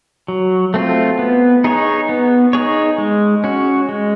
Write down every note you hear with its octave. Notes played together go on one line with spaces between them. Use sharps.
F#3
A3 C4 F4
B3
D#4 G#4 C#5
B3
D#4 G#4 C#5
G#3
C#4 F#4
G#3